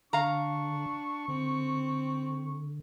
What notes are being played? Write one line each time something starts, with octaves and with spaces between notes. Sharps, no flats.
D3 D4 F5 A#5 C#6
D3 C4